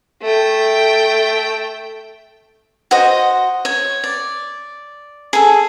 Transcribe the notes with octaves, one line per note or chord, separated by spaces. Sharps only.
A3 G5
F#4 C5 D#5
C#5
D5
G#4 A4